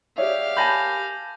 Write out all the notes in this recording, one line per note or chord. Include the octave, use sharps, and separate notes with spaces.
G4 G#4 C#5 D5 E5 F5
A#4 G#5 A5 B5 G6 A#6